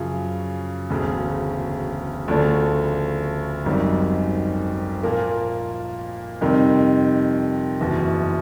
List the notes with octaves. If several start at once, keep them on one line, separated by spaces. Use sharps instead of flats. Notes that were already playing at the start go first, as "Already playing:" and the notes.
Already playing: F#2 C#3 F3
E1 D2 C#3
D2 C#3 F3 A3 D4
G#1 F#2 D#3 G3
A#2 F3 A#3
F2 C3 D#3 G3
F#1 E2 B2